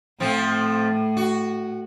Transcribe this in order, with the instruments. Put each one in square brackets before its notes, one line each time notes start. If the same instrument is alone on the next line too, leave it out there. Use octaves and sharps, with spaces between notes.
[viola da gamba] A2 [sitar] F3 A3 C4
[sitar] F#4